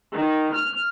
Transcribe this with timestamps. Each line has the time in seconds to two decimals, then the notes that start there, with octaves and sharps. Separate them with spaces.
0.13 D#3
0.55 F6